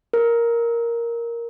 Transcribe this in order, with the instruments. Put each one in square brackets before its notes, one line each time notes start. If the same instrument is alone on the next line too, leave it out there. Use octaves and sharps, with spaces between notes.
[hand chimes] A#4